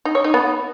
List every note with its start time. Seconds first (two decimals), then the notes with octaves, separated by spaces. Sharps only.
0.05 D#4
0.15 C#5
0.24 D#4
0.34 B3